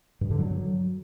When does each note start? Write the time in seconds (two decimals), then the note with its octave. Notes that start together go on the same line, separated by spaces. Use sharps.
0.21 G2
0.31 D3
0.40 F#3